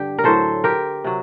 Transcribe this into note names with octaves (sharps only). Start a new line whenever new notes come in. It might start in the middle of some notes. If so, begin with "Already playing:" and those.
Already playing: G2 D3 G4
A#4
A2 F#3 A4 C5
G4 A#4
C3 F#3